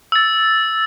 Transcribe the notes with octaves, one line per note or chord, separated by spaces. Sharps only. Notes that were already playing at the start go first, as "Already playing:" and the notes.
E6 A6